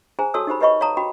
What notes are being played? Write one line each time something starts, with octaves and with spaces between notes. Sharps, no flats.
G#4 C5 G#5 A#5
F#4 A4 C#5 A5 D#6 E6
D#4 G4 C5 B5
G4 B4 C#5 D#5 B5 C#6
C#5 F5 A5 A#5 D#6
F#4 G5 B5